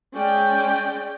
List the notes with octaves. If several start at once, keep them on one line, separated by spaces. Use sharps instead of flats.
G#3 C#4 D5 G5